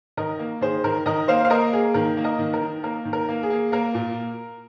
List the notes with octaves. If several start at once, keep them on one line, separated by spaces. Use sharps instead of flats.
D#3 A#4 D#5
A#3
D#3 G#4 C5
D#3 A#4
D#3 A#4 D#5
A#3 C5 F5
F5
A#3 A#4 D#5
A#3 G#4
D#3 A#4
A#3
A#4 D#5
D#3
A#4
D#3
A#3 A#4
D#3
A#4
A#3
G#4
A#3
A#3 A#4
A#2